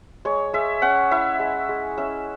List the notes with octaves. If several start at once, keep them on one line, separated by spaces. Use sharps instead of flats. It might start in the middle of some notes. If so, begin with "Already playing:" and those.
G#3 C#5
G#3 E5
C#4 F#5
E4 E5
G#3
G#3
C#4 E5